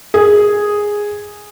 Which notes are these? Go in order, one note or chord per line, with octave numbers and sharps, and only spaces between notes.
G#4